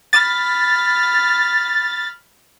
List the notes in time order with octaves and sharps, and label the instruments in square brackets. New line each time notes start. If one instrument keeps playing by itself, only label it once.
[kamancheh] B5 F6 [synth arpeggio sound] A6